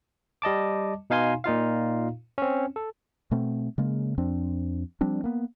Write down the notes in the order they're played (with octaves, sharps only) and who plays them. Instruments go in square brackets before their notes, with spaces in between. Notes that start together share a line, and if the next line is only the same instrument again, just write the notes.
[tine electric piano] G3 D#5 A5 D6
B2 D#4 F5 G#5 C6
A#2 D#4 F4 F5
C4 C#4
A4
[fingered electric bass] B2 A3 C4
C#3 G#3 A#3
F2 F3 C4 D4
F3 G3 C4 D4
A#3 B3